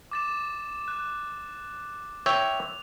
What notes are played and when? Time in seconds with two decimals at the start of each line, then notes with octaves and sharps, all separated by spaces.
0.11 D6 A6 E7
0.88 F#6
2.26 C#5 E5 G5 F7